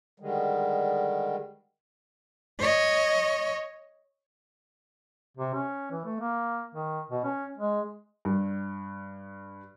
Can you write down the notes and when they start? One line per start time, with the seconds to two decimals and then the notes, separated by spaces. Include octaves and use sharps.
0.20 D3 D#3 G3 G#3
2.59 C#5 D#5
5.37 C3
5.54 C#4
5.91 E3
6.05 A3
6.20 A#3
6.75 D#3
7.10 B2
7.24 C#4
7.57 G#3
8.25 G2